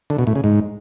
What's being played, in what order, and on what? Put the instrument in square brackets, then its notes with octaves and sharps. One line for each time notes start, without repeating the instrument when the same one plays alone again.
[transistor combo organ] D3
B2
A2
C#3
G#2